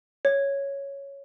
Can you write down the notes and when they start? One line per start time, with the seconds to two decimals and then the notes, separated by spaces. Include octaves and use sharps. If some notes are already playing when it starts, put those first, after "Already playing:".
0.25 C#5